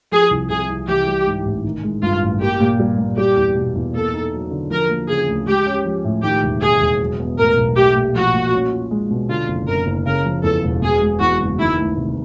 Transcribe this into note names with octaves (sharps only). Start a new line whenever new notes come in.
F3 G#4
C2
C3 G#4
C2
E3 G4
G3
G#2
A1
D#3
G#3
G2 F4
A1
A#3 G4
A#2
G3
A#2
G3 G4
E2
B2
E2
A#3 A4
D#4
F#3
D3
F3 A#4
A#3
C#3 G#4
D2
G#3 G4
C#4
F3
A2
D#3 G4
E1
D#2 G#4
E1
F#3
B3
A2 A#4
B1
A3 G4
A#2
F3 F#4
A#2
C#4
F4
G#3
B2
D3 F4
F#1
F#2 A#4
F#1
C#3 A#4
F3
E2 A4
E1
B2 G#4
G#3
E2 F#4
F#1
D#3 E4
D2
C3